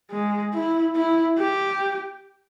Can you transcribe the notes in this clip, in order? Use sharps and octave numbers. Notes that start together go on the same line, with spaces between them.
G#3
E4
E4
G4